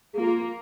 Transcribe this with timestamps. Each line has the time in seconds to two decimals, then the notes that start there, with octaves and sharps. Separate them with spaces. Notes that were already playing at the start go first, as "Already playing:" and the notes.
0.13 G#4
0.18 A#3 F4